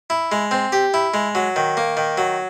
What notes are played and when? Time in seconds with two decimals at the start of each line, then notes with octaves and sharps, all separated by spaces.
0.10 E4
0.32 G#3
0.51 C4
0.72 G4
0.94 E4
1.14 G#3
1.35 F#3
1.56 D#3
1.77 A#3
1.97 D#3
2.18 F#3